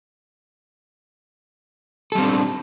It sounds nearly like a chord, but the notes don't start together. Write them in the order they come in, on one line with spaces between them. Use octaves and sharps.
A4 G3 C4 D4